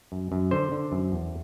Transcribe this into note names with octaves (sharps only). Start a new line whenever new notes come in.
F#2
F#2
D3 C5
D3
F#2
E2